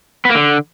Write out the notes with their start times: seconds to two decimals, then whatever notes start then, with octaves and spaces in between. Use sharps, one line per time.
0.25 B3
0.30 A#3
0.35 D3